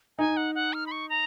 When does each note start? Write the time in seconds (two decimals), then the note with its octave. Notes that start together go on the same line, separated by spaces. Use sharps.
0.18 D#4 G#5
0.37 F#5
0.55 F#5
0.74 F6
0.87 B5
0.91 C#6
1.10 A#5